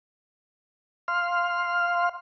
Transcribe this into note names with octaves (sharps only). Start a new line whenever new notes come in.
F5 C6 F6